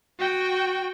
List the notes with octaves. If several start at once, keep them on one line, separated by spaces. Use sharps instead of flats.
F#4 G5